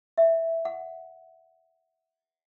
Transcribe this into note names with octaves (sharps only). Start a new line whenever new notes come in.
E5
F#5